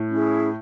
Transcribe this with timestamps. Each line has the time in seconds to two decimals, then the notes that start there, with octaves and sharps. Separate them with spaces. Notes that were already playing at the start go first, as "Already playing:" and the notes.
Already playing: A2
0.09 C#4 E4 G#4